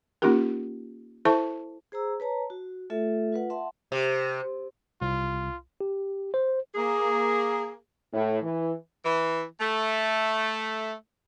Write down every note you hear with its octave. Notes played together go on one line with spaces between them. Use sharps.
A#3 C#4 D#4 F4 G4 A#4
E4 A4 C5 E5 A5 C#6
G#4 C5 A#5 E6
B4 C#5 A5 A#5
F#4
A3 F4 A4 E5
F4 B4 F#5
E5 F#5 A5 C6
C3
C2 F4
G4
C5
A#3 G#4
A2
E3
E3
A3